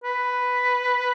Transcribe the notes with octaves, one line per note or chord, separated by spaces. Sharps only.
B4